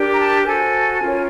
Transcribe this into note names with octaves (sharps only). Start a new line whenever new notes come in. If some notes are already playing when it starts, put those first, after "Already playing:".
Already playing: D4 G4 A#4
A#5
A5
F#4 A4 C5 G#5
C#4 F4 A#4 C#5